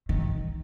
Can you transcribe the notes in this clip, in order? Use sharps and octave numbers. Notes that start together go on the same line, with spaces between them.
D#3